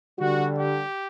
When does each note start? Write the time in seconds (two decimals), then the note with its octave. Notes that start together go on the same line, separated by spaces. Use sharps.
0.19 D3 G3 F#4
0.58 G4